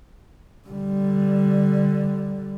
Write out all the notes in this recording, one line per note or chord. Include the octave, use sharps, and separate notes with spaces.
D3 G3